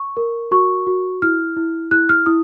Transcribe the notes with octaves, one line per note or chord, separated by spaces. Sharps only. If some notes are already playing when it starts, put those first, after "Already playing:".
Already playing: C#6
A#4
F#4 C#6
F#4
E4 F6
E4
E4 F#6
F6
E4 D#6